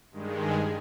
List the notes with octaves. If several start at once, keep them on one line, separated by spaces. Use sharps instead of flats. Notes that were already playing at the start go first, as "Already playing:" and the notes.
G2 D#3 G#3
G#4 G#5